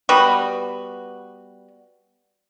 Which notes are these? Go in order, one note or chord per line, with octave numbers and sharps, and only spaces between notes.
G3 B3 F#4